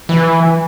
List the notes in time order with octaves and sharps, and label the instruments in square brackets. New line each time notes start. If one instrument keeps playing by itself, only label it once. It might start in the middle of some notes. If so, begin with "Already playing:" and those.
[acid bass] E3